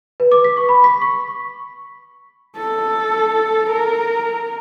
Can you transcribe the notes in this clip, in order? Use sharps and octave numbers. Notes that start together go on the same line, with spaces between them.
B4
D6
B6
C#6
B5
B6
C#6
A4
A#4